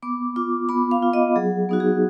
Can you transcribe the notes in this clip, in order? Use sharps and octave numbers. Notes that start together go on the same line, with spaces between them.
B3 D6
F4 D6
B3 B5
F5
F4
D#5
F#3 G#4
B3 D#4 F#4
G#4